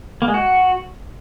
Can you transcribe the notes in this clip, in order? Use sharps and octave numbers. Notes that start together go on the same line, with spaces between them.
A#3
G#3
F#4